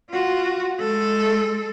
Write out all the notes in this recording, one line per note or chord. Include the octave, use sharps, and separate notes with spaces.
F4 F#4
G#3 A4